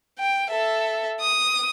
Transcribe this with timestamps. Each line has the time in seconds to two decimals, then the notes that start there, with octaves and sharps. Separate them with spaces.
0.19 G5
0.50 A4 E5
1.20 D#6